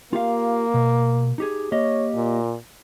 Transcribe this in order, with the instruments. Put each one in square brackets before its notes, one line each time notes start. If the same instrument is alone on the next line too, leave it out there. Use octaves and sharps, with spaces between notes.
[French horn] A#3 [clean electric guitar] F4 G4 F5
[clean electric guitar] B2
D#4 G4 G#4
[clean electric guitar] A#3 G4 D#5 [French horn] C#5
[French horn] A#2